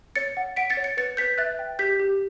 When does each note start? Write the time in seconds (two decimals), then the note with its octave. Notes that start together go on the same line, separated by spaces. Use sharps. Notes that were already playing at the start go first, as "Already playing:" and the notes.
0.16 C#5 A6 C#7
0.37 F#5
0.56 F#5 B6 D7
0.70 A6 C#7
0.77 C#5
0.84 A6 C#7
0.97 B4 A6 C#7
1.17 B4 G6 B6
1.38 E5 F#6 A6
1.59 G5
1.79 G4 G6 B6
2.00 G4